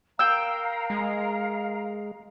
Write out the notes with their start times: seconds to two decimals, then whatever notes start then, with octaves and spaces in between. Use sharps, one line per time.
0.19 A#4 F5 G5 A#5 E6
0.90 G#3